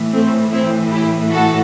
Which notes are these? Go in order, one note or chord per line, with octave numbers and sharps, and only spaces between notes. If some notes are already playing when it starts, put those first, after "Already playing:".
Already playing: A2 E3
A3 C4
C4 E4
E4 G4
F#4 A4